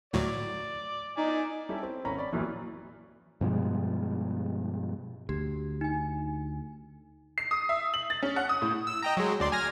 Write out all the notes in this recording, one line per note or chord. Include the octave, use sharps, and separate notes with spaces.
D2 A2 F#3 D5
D#4 D5 G#5
G3 C#4 E4 G4 A4
C4
G#1 C#4 A#5 B5
D5 B5
A1 F#2 A#2 E3
G2 B2 F3 G#3
D2 G4
D#4 G#5
C7
D#6
E5
F#7
A6
C#4
F#5
D#6
A2
E6
D#5 G5 A#5
F#3 G#3
D2 D5 C6
G#5 F6 A#6